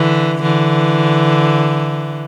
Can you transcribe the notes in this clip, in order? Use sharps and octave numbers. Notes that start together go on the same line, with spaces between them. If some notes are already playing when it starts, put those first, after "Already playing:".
Already playing: D3 E3
D3 E3